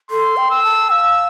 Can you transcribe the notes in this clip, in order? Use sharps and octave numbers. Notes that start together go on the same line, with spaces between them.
A4 C6
G5
E6
A5
F5 E6